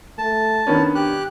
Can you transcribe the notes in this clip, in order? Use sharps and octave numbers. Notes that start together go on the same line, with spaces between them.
A3 A5
D#3 B3 C#4 D4
G4 F#6